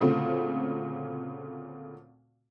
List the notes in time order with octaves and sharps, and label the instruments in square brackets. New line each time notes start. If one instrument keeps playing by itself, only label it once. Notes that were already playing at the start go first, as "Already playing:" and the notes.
[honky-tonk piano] D2 A#2 C#3 A3 C4